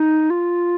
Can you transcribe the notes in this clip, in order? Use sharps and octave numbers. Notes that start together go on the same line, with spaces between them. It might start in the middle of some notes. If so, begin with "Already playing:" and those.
Already playing: D#4
F4